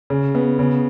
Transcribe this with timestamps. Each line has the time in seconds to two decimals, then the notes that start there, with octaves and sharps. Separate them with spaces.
0.10 C#3
0.35 B3
0.59 C#3